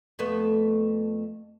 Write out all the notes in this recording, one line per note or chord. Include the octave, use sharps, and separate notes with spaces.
F2 A3 B3